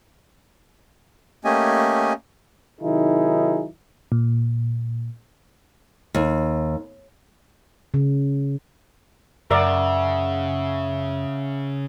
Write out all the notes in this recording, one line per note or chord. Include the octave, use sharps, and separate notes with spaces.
A3 A#3 C#4 G4 D#5 G#5
C3 D#3 F#3 D#4 E4 G#4
A#2
D#2
C#3
F#2 C#3 A#4 D5 E5 F#5